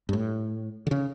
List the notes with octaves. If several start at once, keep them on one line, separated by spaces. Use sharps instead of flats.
G2
A2
D3
C#3